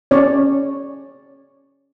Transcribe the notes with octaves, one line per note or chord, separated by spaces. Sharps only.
C#4 C#5 D5